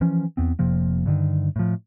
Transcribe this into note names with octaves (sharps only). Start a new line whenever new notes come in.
E3 F3 C#4
E2 B3 C4
F1 C3 F3 A#3
G2 D3 D#3
A2 F3